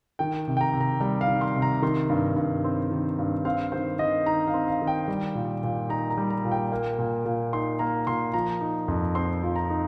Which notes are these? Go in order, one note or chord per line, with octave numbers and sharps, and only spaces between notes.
D#3 G5
C3
G5
A#5
C3
A#5
G3 A#5
F5
D#3
C6
C3
A#5
D#3 C6
G2
G2
C4
D#3
G2
C4 F5
D#3 C5
D#3 D#5
D#4 A#5
F5
C4
F5
D#3
G5
G3
A#2
A#2
D#4 A#5
A#5
G3
A#5
A#2
G5
A#3
A#2
A#2
D#4 C6
A#3 A#5
A#2 C6
F3 A#5
D#4
F2
C4 C6
F3
A#5
D#4